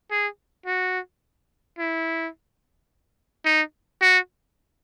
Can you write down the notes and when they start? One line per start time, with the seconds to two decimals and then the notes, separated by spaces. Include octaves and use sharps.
0.11 G#4
0.66 F#4
1.78 E4
3.45 D#4
4.02 F#4